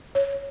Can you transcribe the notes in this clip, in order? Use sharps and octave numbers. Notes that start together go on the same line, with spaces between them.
C#5